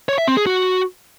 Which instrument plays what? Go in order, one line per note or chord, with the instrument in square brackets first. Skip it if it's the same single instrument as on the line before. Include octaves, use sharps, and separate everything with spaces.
[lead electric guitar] C#5
E5
C4
G#4
F#4